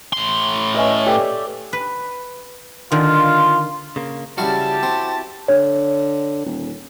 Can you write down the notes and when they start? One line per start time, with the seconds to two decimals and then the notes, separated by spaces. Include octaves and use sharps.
0.13 A2 C6
0.74 C#4 B4 D#5 E5 C#6 E6
1.06 G4 A4 B4 D5 G7
1.73 B4
2.92 D3 D#3 F4
3.96 C#3 A#3
4.38 C#3 G3 E4 F#4 G4 F5 A5
4.83 C4
5.48 D3 C#5
6.45 D#1